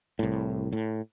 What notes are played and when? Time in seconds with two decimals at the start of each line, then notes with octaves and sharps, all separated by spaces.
0.19 C2 A2
0.73 A2